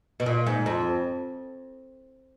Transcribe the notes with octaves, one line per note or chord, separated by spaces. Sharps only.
B2
A#2
G#2
F2